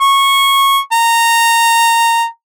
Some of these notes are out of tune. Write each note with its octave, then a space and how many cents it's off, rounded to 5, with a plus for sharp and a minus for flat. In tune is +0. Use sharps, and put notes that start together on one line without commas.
C#6 -15
A#5 -15